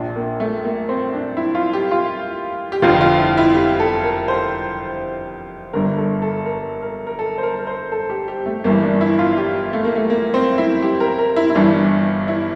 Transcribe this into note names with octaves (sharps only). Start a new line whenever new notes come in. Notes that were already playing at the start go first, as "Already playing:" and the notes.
Already playing: A#1 A#2 D4
A#3
A3
A#3
C4
D4
E4
F4
G4
F4
G4
F1 F2 D3 F4
F4
E4
E4
G4
A4
A#4
C5
G1 G2 D3 A#4
A4
A4
A#4
A#4
A#4
A4
C5
A#4
A#4
C5
A4
G4
G4
A3
G1 G2 E3 A#3
D4
E4
F4
G4
A3
A#3
A3
A#3
C4
E4
G4
A#4
A#4
E4
E4
G1 G2 E3 D4
E4